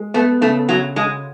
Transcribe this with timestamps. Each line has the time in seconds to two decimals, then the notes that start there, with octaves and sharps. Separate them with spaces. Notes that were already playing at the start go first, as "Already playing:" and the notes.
Already playing: G#3
0.14 A3 B3
0.41 C#3 A3
0.69 C#3 F#3
0.96 C#3 G#3